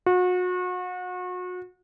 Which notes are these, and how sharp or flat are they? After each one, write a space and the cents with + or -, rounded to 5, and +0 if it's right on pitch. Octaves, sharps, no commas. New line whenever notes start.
F#4 -35